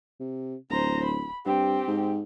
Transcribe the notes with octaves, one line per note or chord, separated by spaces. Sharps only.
C3
D1 C5 A#5
B5
G2 C4 G4
G#2